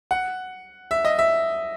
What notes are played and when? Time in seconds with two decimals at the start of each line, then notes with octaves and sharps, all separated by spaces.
0.11 F#5
0.91 E5
1.05 D#5
1.19 E5